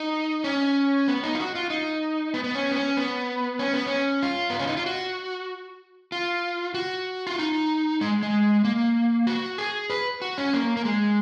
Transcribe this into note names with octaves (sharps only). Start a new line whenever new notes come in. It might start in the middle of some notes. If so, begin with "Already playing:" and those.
Already playing: D#4
C#4
B3
D#4
F4
F#4
F4
D#4
B3
B3
C#4
B3
C#4
B3
C#4
B3
C#4
F4
B3
C#4
D#4
F4
F#4
F4
F#4
F4
D#4
G#3
G#3
A#3
F#4
G#4
B4
F#4
C#4
A#3
A#3
G#3